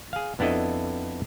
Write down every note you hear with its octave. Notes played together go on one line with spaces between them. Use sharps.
G#4 F5
F2 B3 D4 E4 A4 D#5